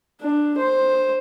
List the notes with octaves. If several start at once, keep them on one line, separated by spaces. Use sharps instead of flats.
D4
C5